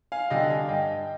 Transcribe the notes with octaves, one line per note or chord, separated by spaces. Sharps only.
F5 G#5
D3 G3 D4 D#5 G5
F5 G#5
G2 D#5 G5